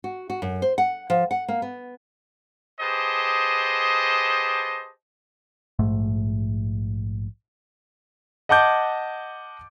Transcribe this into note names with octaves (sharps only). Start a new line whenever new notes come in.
F#4
F#4
F#2
C5
F#5
F3
F#5
A#3
B3
G4 G#4 B4 C5 D#5 A5
A#1 G#2 A3
D#5 F#5 A5 D6 G6